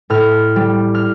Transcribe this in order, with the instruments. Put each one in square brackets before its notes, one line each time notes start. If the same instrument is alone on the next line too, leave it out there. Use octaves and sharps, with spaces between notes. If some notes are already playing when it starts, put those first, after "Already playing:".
[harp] A2 F6
G3
F6